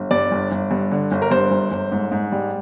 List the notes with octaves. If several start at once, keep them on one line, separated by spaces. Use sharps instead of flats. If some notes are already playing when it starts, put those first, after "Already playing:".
Already playing: G1
G2 D5
G1
G1
G2
D3
G1
A#4
G2 C5
G1
G1
G#2
G#2
G3